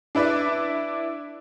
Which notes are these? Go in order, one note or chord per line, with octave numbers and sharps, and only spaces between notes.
D4 E4 B4 D5 E5